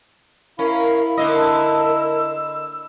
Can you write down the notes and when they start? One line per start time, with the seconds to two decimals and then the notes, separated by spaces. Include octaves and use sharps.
0.59 C#4 E4 A#4 F5
1.17 D3 A#3 A#4 D#5 E6